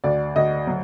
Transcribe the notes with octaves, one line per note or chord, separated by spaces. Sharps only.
D2 D5
D2 D#5
F#3